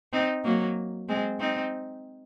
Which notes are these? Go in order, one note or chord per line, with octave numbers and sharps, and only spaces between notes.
C4 D#4
F#3 A#3
G#3 C4
C4 D#4